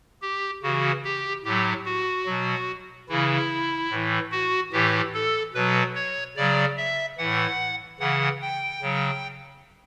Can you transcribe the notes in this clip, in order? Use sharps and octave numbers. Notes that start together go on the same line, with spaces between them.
G4
C#3 E3 F#4
G4
A2 F#3 G4
F#4
B2 F#3
C#3 E3 E4
A2 E3
F#4
A2 E3 G4
A4
B2 F#3 B4
C#5
C#3 F#3 D5
E5
A2 E3 F#5
C#3 E3 F#5
G5
C#3 F#3